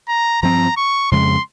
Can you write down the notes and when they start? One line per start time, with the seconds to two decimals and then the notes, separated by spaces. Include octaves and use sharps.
0.08 A#5
0.42 G2 F3 C4 A#5
0.77 C#6
1.12 F2 C#3 G#3 C6